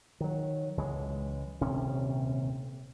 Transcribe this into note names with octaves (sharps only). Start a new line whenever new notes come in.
D#3 F#3
C#2 E3 F#3 G#3
D#1 D2 C3 C#4